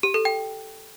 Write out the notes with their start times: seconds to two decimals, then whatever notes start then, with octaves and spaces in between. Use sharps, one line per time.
0.03 G4
0.14 A4
0.25 G5